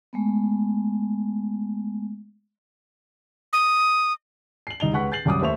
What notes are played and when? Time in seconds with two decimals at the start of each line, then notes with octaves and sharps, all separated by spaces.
0.13 G#3 A3 B3
3.53 D#6
4.67 C7 F#7
4.80 C2 D#4 F7 G7
4.93 C#2 B4 F#5 C#6 F#6 B6
5.12 G6 A6 C7 F#7
5.25 C2 F#2 D6 D#6
5.41 D#2 A3 C5 E5 C#6 F7